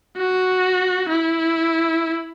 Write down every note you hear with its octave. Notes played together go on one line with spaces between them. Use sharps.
F#4
E4